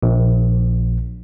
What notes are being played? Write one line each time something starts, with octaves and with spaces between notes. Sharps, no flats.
A#1